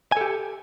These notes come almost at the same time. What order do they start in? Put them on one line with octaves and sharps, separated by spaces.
G#5 A4 G4